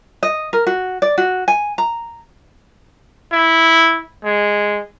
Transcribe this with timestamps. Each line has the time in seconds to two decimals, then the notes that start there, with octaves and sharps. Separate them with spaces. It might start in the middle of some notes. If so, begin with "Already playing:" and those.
0.23 D#5
0.53 A#4
0.67 F#4
1.02 D5
1.18 F#4
1.48 G#5
1.78 A#5
3.32 E4
4.24 G#3